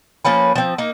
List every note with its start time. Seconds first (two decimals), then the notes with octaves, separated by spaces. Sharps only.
0.25 F3 A#3 C#4 B4
0.55 F3 C4
0.78 A#3 D#4